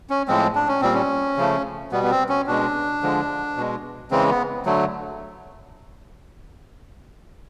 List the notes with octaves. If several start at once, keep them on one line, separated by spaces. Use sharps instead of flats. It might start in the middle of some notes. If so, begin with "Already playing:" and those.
C#4
A2 F3 G#3 C4
D4
C#4
A#2 G3 C4
C#4
C#3 F3 A3
B2 G3 B3
B3
C4
C#4
B2 G#3 D4
D3 F3 G#3
B2 G#3
C#3 E3 G#3 C4
B3
D3 F#3 A3